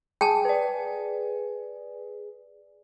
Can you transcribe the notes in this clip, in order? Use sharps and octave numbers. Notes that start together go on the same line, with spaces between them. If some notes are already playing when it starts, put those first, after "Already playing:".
G#4 G5 A5
B4 D5